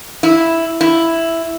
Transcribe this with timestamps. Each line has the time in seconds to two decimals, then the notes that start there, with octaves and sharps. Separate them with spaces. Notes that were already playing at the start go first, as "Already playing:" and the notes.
0.23 E4
0.81 E4